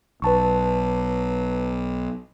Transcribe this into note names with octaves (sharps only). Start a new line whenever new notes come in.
B1 B4 A5 C#6